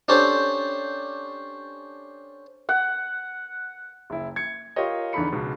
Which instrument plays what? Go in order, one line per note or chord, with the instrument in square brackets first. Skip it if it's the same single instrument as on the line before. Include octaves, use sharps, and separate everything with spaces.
[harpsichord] C#4 D4 G4 A4 C5
[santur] F#5
[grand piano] F#1 E4
G#6 C#7
F4 G4 A#4 C#5 D#5
E2 D3 D#4 A4 B5 C#7
C#2 B2